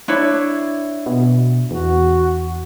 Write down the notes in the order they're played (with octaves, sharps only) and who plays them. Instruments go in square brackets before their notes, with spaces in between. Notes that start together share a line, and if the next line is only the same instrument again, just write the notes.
[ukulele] D4 E4 C#5
[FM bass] B2
[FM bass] E2 [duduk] F#4